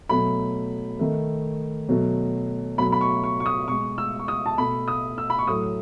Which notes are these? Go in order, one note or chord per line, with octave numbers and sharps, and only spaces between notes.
B2 F#3 A3 B5
D#3 A3
B2 F#3 A3
B2 F#3 A3 B5
B5
C#6
C#6
C#6
D#6
B2 G#3 C#6
E6
C#6
D#6
A5
B2 A3 B5
D#6
E6
B5
C#6
A2 F#3 A3 D#6